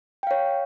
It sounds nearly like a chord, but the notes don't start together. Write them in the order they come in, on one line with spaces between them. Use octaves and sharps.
G5 F5 C#5